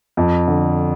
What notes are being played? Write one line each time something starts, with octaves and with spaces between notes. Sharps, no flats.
F2
D3